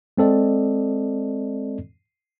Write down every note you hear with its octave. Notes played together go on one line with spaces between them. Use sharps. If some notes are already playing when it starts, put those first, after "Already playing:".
G#3 C4 A4 D5 D#5